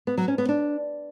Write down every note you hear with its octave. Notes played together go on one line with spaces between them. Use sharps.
B3
F#3
C#4
B3
D4